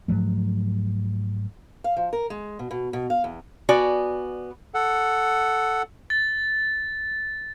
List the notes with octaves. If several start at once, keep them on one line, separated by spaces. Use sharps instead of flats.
G#2 F3 F#3 A3
F5
F3
A#4
G#3
B2
B2
B2
F5
E2
B3 F#4 D5 G#5
A4 F#5
A6